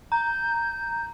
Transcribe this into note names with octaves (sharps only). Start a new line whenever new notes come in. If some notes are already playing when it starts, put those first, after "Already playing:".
A#5 G6